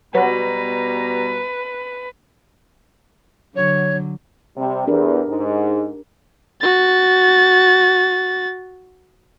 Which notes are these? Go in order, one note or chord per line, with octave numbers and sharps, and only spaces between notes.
B2 F#3 G3 B3 F#4 B4 A#5
D3 F#3 C#5
C3 G3
E2 D4 G4 A#4
G#2
F#4 A6